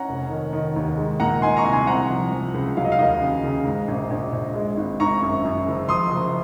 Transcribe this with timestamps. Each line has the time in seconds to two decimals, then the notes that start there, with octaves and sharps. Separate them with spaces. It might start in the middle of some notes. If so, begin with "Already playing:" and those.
Already playing: C#4 F#5 A#5
0.09 F1
0.30 D#3
0.53 D#3
0.76 D#2
0.97 G#3
1.20 A#2 F#5 A#5
1.42 D#4 G#5 C6
1.57 A#5 C#6
1.64 C2
1.72 G#5 C6
1.87 C4 F#5 A#5
2.10 F3
2.32 F3
2.54 C#2
2.77 F#3 F5
2.84 D#5
2.92 F5
2.98 D#2 D#5
3.22 C#3
3.44 C#3
3.65 G#2
3.88 A#1
4.10 A#1
4.32 A#1
4.55 G#3
4.77 G#1
5.00 G#1 A#5 C#6
5.22 F#2
5.45 F#2
5.67 F#1
5.89 F3 C6 D#6
6.11 F#1